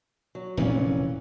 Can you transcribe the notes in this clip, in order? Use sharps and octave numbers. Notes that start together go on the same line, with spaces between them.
F#3
F1 A#2 E3 C#4